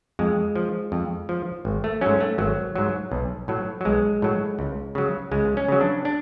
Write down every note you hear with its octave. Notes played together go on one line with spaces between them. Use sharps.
F2 G#3
F3
F2
F3
G#1
A3
G#2 F#3 C#4
A3
G#1 F#3
G#2 F#3
B1
A2 F#3
F#3
B1 G#3
A2 F#3
C#2
C#3 F#3
C#2 G#3
C#4
C#3 F#3
D4
D4